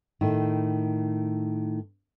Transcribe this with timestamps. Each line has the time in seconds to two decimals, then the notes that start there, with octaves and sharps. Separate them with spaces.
0.21 A2 D#3